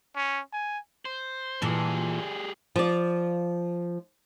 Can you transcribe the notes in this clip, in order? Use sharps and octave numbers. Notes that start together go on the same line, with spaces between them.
C#4
G#5
C5
A#2 E3 G3 G#4 A4
F3 D5